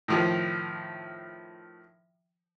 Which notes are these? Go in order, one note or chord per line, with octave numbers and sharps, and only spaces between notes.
A2 D#3 F3